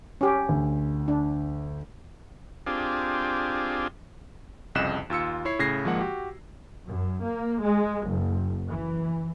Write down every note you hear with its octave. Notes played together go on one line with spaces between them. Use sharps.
C#4 G4
D2
D4
C4 D4 F4 G4 G#4
C2 F2 C#3 D#5 F#6 E7
D#2 F4 E6 C#7
E4 C#5 C7
A2 C#3 G#6 A#6 C7
G#1 F3 G#3 A#3 F#5
F#4 G4
F#2
A#3
G#3
F#1
E3